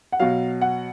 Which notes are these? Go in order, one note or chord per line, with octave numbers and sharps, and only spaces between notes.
F#5
B2 F#3 F5
F#5